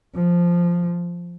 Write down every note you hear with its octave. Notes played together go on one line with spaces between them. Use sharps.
F3